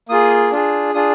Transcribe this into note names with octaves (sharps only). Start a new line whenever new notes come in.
A#3 F4 G#4 D#6
D4 F4 G#4
D4 F4 G#4 D#6